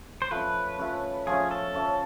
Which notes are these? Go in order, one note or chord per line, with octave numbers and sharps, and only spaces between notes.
C5
F3 A3 C#4 B4
F3 A3 C#4
F3 A3 C#4 G#4
A4
F3 A3 C#4